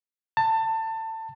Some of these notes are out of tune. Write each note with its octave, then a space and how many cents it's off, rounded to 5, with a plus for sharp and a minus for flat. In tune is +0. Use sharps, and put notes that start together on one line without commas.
A5 +25